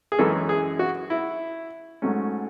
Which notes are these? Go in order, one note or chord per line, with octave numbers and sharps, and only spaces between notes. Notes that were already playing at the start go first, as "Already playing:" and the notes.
G#4
F#2 E3 G#3 C#4 A4
G#4
F#4
E4
G#2 F#3 A3 C#4